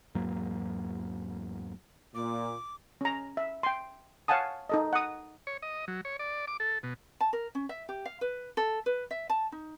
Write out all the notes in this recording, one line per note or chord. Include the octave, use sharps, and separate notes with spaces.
E2 G#2 F#3 A#3
A#2 D6
C#4 A#5
E5
G5 C6
C#5 F5 F#5 G#5 A5 D#6
D#4 A4 D#5
F#5 D#6
C#5
D#5
F#3
C#5
D5
D6
A4
B2
A5
A#4
C#4
E5
G4
F5
B4
A4
B4
E5
A5
D#4